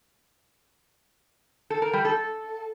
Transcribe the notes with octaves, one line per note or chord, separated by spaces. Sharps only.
A4
A#4
G3
A4